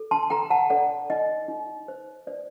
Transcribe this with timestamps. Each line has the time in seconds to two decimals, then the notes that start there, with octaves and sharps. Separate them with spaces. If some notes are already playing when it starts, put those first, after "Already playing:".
Already playing: A4
0.11 A5 C6
0.30 A4 G5 A#5
0.50 F#5 A5
0.70 A4 D5 F#5
1.10 D#4 D#5
1.48 D#4
1.88 C5
2.27 C5 D5